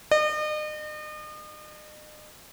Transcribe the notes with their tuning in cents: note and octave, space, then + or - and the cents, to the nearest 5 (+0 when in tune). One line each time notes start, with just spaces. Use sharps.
D#5 -40